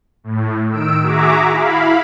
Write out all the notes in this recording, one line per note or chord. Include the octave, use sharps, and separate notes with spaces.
A2
D#3 E6 D7
F#4 G#4 E5 A#5 D6
E4 F5 B5